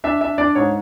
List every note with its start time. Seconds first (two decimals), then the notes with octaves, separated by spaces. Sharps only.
0.04 D4 E5
0.21 D4 E5
0.38 D4 D5
0.55 G#2 C#5